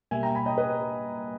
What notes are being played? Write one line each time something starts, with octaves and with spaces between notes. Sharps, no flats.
B2 G3 A#3 E5 G#5
G5 A#5
G#5 B5
D#5 G5
B4 D#5